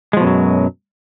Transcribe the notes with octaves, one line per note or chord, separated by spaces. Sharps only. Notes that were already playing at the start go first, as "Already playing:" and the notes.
F#2 B2 F3 F#3 G#3